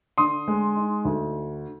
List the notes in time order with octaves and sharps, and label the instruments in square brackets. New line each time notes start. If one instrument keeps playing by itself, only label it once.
[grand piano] D3 C6 D#6
G#3
D#4
D2